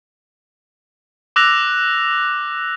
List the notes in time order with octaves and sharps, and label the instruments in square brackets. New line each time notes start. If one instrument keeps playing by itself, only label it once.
[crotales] D6 E6 F#6 A#6 F7